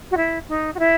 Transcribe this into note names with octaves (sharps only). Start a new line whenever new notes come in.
F#4
E4
D#4
F#4
E4